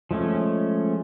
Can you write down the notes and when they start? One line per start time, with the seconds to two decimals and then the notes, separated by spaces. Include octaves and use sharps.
0.11 F3 G#3 A3 C#4